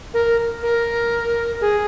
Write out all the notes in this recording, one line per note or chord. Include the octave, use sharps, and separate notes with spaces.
A#4
A#4
G#4